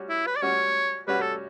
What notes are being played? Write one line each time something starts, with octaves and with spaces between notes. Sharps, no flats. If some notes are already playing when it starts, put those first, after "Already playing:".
Already playing: G3 C#4 F#4
E4
B4
D5
G3 C#4 F#4 C#5
G3 C#4 F#4 B4
A4